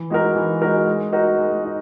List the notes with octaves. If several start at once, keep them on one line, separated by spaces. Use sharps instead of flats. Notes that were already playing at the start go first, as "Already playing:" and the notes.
Already playing: E3
G#3 D#4 F#4 A#4
E3
G#3 D#4 F#4 A#4
G#3
D#4 F#4 A#4
G#3
D#4